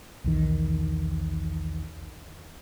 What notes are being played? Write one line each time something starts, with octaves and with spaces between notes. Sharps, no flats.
B1 E2 D#3